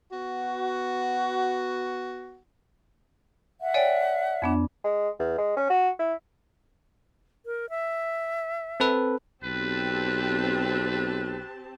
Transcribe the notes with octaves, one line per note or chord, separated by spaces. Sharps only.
B3 F#4
E5 F#5
C#5 D5 G5 G#5 D7
F2 B3 D4
G#3
E2
G#3
C#4
F#4
E4
A#4
E5
C4 A4 B4
B1 C4 G4 B4 A5